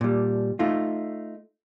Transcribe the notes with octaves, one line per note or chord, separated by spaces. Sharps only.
A#2 G3
A3 D#4 F4